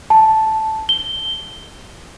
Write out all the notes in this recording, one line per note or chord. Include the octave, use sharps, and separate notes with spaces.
A5
G7